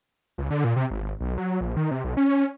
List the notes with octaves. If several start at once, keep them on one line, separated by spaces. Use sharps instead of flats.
C#2
D3
A#2
C3
G#1
B1
F#3
A#1
D#3
C3
B1
C#4